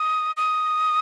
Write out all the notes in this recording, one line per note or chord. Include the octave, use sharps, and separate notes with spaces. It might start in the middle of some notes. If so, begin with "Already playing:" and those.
Already playing: D#6
D#6